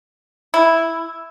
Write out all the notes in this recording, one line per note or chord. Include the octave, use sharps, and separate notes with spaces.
E4